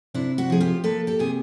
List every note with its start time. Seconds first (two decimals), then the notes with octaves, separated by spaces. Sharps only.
0.14 C3 D4 E4
0.38 E4 F#4
0.50 F3 G#4
0.60 F4 G4
0.84 A#3 A4 B4
1.07 G4 A4
1.19 C3 G#4